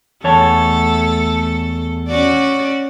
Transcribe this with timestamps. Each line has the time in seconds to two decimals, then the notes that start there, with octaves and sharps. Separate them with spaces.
0.24 E2 A3 A4 C#5 A5
2.08 C#4 F#4 D5